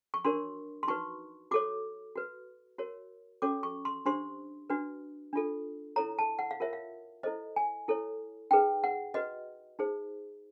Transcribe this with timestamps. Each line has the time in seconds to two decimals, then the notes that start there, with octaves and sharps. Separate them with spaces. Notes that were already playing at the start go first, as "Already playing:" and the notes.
0.14 C#6
0.25 D4 F#4 A#4 C#5 C6
0.83 C6
0.88 D#4 F#4 B4 C#6
1.51 F#4 A4 C#5 D6
2.16 F#4 B4
2.78 F#4 A#4 C#5
3.42 C#4 F#4 A4 C#5 D6
3.63 C#6
3.85 C6
4.06 D4 G4 C5 C6
4.70 D4 F#4 B4
5.33 D4 F4 A4
5.96 E4 A4 C#5 A#5
6.19 A5
6.39 F#5
6.51 F5
6.60 F4 A#4 C#5 E5
6.73 F5
7.23 E4 A4 C5 D#5
7.56 G#5
7.88 E4 A4 C#5
8.51 D#4 G#4 B4 G5
8.84 F#5
9.14 F#4 B4 D#5
9.79 D#4 G#4 C5